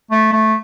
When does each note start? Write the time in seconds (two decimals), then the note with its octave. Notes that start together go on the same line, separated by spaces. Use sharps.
0.11 A3
0.33 A3